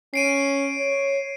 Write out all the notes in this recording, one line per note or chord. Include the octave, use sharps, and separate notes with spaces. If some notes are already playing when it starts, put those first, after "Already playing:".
C#4 C7 D7 D#7
C#5